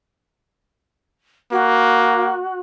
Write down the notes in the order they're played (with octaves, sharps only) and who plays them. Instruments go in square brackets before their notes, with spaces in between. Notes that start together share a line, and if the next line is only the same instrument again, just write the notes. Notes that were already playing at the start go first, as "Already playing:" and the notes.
[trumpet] A#3 [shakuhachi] F#4